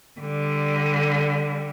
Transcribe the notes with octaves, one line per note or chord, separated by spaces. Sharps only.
D3 G3